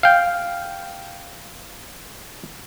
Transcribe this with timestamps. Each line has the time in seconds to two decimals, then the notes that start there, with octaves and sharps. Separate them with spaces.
0.03 F5 G5